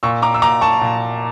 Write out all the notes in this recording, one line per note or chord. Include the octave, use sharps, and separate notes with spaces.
A#2 C#6 E6
A#5 D6
E6
A#2 A#5 D6
A5 C#6
A#2